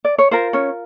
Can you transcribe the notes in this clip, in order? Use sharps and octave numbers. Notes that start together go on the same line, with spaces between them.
D5
C#5
F4 A#4 C5
C#4 C#5